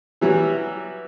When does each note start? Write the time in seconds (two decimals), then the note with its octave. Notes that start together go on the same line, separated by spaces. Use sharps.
0.21 E3 F#3 G3